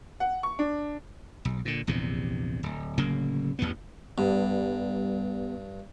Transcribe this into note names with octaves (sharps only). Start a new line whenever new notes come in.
F#5
C#6
D4
B1
A#2 D3
A#1 E2 G2 C3
D1
D1 C#3 F#3 A#3
A1 E2 G2 B3
G2 G3 B3